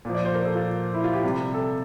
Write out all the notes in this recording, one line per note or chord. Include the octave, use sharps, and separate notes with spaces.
A#2 F3
D5
C5
A#4
A4
F4
E4
F4
G4
C3 G3
A4